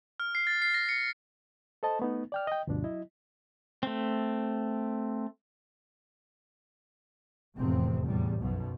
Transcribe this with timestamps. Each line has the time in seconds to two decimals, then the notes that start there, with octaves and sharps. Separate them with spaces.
0.20 F6
0.35 C7
0.47 A6
0.62 C7
0.74 A#6
0.89 C#7
1.83 A4 C5 D#5 A5
1.99 A3 B3 D#4
2.32 D5 G5 F6
2.47 D#5 G5
2.67 D2 G2 B2 F3 D4
2.84 F#3 E4 D#5
3.83 A3 C4
7.58 F1 E2 A2 C3 C4
8.03 E2 A2 G3
8.41 B1 F#2 B2 F3